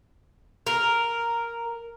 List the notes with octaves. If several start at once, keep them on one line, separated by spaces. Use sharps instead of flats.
A#4